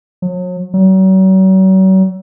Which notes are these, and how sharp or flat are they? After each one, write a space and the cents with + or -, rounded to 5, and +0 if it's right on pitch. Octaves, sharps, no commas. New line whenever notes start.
F#3 -40
F#3 +40